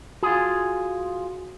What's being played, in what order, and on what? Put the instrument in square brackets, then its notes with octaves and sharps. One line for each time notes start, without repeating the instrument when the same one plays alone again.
[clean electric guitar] F4 G#4 [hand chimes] F#4